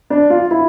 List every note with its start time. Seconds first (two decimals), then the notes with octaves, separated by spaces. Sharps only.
0.10 D4
0.30 F4
0.51 E4